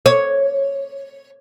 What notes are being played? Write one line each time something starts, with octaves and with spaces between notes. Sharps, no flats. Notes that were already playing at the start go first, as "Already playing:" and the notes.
C#5